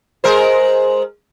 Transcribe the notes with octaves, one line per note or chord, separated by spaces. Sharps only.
G#3 A#4 C5